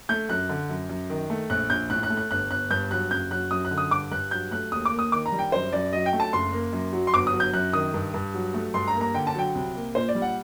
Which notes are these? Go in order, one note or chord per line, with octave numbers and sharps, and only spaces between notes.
A3 G6
F#2 F#6
D3
F#2
F#2
D#3
A3
A#1 F#6
A#1 G6
A2 F#6
F#6
A3
F#6
G1 F#6
G1 F#6
G2 G6
F#3 F#6
F#1 G6
F#3 F#6
F#2 D#6
F#6
D3
D#6
G2 D6
G2 F#6
F#3 G6
A3 F#6
D#2 D#6
D6
A#3
D#6
D#3 D6
A#5
G3
G5
F#2 C5
F#2 D5
F#3 D#5
G5
A3
A5
F#1 C6
A#3
F#2
F#3
C6
G1 D6
D#6
F#3
G6
F#2 F#6
D#3 D#6
G2
G2
F#3
A3
G2 C6
A#5
A#3
A#5
D3 G5
A5
F#3 G5
C2
A#3
A#2 C5
D5
G3
F#5